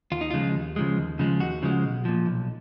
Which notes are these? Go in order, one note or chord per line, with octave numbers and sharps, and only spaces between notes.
D#2 F4
D#4
C#3 F3 G#3 F4
D#2
C#3 F3 G#3
D#2
C#3 F3 G#3
D#2 F#4
C#3 F3 G#3
B1
A#2 F3
B1